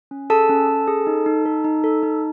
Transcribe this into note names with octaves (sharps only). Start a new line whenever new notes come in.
C#4
G#4 A4 A5
C#4
C#4
G#4
D#4
D#4
A4
D#4
A4
D#4